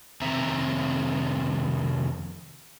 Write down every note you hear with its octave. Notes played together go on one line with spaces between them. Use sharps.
F2 C3 D#3 C4 E5 A#5